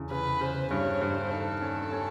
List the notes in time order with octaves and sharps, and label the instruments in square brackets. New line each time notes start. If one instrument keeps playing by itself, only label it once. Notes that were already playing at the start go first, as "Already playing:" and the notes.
Already playing: [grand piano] E2 C#3
[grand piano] C#3 [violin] B4
[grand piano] C#3 [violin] C5
[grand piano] G2 [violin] C#5
[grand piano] G2 [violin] C5
[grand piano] D#3 [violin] A4
[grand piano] C#4 [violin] A4
[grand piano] C#4